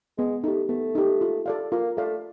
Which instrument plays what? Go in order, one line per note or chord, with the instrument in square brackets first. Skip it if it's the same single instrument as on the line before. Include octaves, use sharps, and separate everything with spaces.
[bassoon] G#3 [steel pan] B3
[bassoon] A3 [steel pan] D#4 G4
[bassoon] A3 [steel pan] B3
[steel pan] D#4 G4
F4
A4 D5 F5
[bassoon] A#3 [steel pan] F4
[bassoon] A3 [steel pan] A4 D5 F5